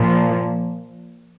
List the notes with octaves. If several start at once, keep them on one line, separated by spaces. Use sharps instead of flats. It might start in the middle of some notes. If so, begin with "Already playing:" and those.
Already playing: A#2 F3 A#3